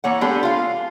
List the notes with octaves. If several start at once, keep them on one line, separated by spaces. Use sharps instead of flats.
E3 A#3 C#5 F#5
G#3 B3 D4 G4 A4
F4 F5